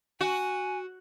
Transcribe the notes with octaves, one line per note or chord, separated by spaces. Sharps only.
F#4 G#5